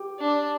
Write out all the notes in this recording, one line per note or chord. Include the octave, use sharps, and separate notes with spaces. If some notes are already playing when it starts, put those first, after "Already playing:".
Already playing: G4
D4